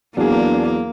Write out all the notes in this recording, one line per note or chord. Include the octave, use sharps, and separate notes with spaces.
E2 F#3 A#3 D4 G#4